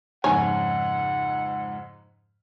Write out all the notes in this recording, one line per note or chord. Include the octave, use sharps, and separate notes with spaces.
F2 G#2 C#3 C#5 F#5 G#5